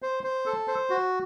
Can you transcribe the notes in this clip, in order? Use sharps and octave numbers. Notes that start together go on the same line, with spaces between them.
C5
C5
A4
C5
F#4